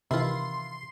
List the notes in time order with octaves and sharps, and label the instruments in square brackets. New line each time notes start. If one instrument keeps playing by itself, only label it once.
[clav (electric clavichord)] C3 D#3 E3 [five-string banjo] E4 F4 [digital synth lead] C6